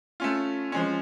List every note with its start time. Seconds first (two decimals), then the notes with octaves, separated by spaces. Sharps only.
0.20 A3 C#4 F4
0.72 F3 G#3 C#4